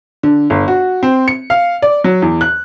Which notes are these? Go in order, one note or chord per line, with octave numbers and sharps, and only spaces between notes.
D3
G1
F#4
C4
C#7
F5
D5
F#3
E2
F#6